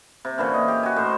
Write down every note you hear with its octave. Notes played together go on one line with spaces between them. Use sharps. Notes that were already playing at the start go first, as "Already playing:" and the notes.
C3
A#2 D3 E3 C#4
D#5
G4
F#4 G#5
A2 C5